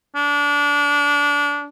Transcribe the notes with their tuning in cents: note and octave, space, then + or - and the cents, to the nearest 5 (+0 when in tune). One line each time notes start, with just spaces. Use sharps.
D4 -25